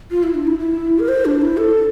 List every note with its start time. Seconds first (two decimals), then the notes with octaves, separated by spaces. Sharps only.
0.11 F4
0.23 E4
0.34 D4
0.47 E4
0.59 E4
0.99 A#4
1.08 C5
1.25 D4
1.41 E4
1.57 A4